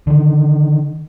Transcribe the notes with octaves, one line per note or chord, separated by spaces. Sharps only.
D3 D#3